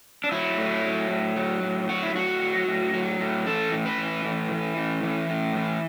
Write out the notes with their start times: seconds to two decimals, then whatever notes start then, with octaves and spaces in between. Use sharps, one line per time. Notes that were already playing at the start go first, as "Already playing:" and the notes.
0.24 D4
0.32 F#3 E4
0.58 A2
0.84 F#3
1.11 A2
1.36 F#3
1.63 A2
1.89 F#3 F#4
2.03 E4
2.15 A2 F#4
2.42 F#3
2.68 A2
2.94 F#3
3.20 A2
3.46 E3 A4
3.72 A2
3.86 B4
3.98 E3
4.25 A2
4.51 E3
4.77 A2
5.03 E3
5.29 A2
5.56 E3